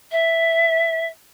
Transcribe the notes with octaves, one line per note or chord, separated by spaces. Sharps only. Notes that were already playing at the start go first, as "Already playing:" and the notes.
E5